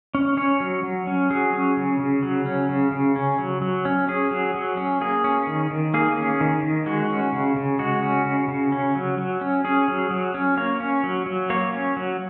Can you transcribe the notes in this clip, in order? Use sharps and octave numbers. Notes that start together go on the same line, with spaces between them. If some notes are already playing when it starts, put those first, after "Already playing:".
C#4
C#4 C#5
F#3
F#3
C#4
F#3 G#4
C#4
C#3
C#3
F#3
C#4
C#3
C#3
C#4
F#3
F#3
C#4
C#4 G#4
F#3
F#3
C#4
A#3 G#4
C#4
D#3
D#3
A#3 G#4
C#4
D#3
D#3
G#3 F#4
C#4
C#3
C#3
G#3 F#4
C#4
C#3
C#3
C#4
F#3
F#3
C#4
C#4 G#4
F#3
F#3
C#4
A#3 C#5
C#4
F#3
F#3
A#3 C#5
C#4
F#3